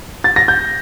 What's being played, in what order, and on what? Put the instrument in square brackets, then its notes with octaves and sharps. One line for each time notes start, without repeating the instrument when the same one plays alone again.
[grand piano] A6
A#6
G6